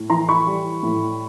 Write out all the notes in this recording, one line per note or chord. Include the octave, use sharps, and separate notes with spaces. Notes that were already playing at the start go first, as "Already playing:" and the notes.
Already playing: A2
E3 A#5 C6
B5 C#6
G3
A2